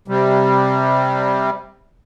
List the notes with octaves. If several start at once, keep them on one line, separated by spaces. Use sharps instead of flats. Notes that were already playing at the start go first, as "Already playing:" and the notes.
C3 G3